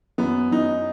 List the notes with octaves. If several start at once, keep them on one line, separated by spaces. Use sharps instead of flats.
F#2 B3
F#2 D#4